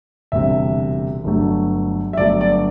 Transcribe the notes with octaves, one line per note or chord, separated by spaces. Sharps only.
E1 D2 C3 G3 E5
G1 G2 F#3 A3
E5
G1 G2 F#3 A3 D5
D5